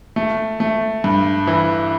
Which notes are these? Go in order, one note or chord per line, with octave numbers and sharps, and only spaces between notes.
A3
A3
G2
E3